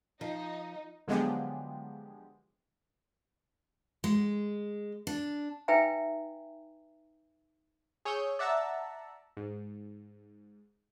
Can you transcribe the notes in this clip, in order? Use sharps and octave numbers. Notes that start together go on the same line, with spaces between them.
F3 D#4
D3 F3 F#3 G#3 B3 G4
G#3
D4
D#4 B4 E5 G5 G#5 A#5
G#4 C#5 C#6 D#6 E6 G6
D5 E5 F#5 A5 A#5 E6
G#2